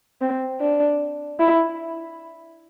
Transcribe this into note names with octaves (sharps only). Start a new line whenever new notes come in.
C4
D4
E4